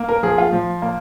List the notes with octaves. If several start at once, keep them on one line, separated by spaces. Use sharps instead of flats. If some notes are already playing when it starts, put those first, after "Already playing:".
Already playing: A#3
A#4
F3 G#4
F4
F3
A#3